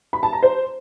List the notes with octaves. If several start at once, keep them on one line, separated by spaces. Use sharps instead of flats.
B5
A5
A#5
C5